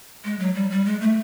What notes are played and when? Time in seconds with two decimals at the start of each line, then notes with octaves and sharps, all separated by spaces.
0.25 G#3
0.40 F#3
0.55 G3
0.70 G3
0.85 G#3
1.01 A3